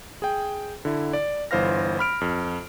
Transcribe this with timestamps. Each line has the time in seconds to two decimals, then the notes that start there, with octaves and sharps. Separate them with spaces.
0.22 G#4 G5
0.85 D3 E4
1.13 D5
1.51 G1 E3 C5 F5 F6 A#6
1.99 B5 F6 D7
2.21 F2